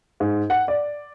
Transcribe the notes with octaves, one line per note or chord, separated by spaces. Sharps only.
G#2
F#5
D5